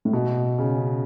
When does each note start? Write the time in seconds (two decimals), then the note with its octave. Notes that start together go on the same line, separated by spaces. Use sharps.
0.05 A2
0.13 B2
0.59 C#3